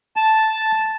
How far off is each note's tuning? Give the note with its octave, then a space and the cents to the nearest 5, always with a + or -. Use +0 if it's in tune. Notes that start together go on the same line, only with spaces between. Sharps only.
A5 -5